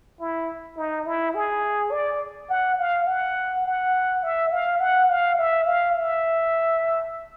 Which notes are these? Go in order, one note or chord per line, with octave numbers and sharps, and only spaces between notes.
E4
D#4
E4
G#4
D5
F#5
F5
F#5
F#5
E5
F5
F#5
F5
E5
F5
E5